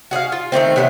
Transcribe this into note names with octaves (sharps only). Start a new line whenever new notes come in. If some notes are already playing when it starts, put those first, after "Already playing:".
F#4 G#4 C#5 F5
F4
D#3 A3 A#3 C4
C3 E3 F#3 B3